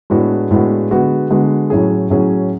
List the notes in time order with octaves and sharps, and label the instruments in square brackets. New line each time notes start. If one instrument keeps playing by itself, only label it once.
[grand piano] A2 G#3 B3 D4 F#4
A2 G#3 B3 D4 F#4
D3 G#3 B3 F#4
D3 G#3 B3 F#4
A2 F#3 C#4 G#4
A2 F#3 C#4 G#4